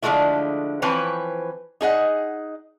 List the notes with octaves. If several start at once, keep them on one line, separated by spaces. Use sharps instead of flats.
D3 F3 F#3 G#3 A3 E4
E3 F3 C4 B4 C#5
D#4 G#4 D#5 F#5